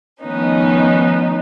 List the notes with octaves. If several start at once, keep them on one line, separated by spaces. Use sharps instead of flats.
D#3 F3 A3 B3 C#4 D#4